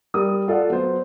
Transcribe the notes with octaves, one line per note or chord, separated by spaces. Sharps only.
G3 A#4 D#6
F4 A4 D5 F#5
F#3 B3 C5